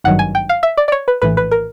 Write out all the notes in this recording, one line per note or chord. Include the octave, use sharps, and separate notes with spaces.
G#1 G2 D#3 F#3 F#5
G#5
G5
F5
E5
D5
D5
C#5
B4
A#1 A2 E3 B4
B4
A#4